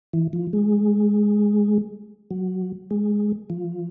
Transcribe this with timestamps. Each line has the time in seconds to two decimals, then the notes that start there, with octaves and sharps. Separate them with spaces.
0.13 E3
0.33 F3
0.53 G#3
2.31 F#3
2.91 G#3
3.50 F3